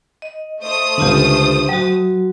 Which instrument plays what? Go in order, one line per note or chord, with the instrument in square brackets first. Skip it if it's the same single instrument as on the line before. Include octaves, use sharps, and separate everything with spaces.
[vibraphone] D#5
[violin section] A3 C5 D#6
[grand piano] C#2 D3 [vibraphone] D4 F4 G4
[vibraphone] F#3 F#4 [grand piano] G5